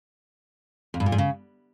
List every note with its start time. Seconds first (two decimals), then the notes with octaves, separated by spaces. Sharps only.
0.94 F2
1.00 G2
1.06 A#2
1.12 G#2
1.18 C#3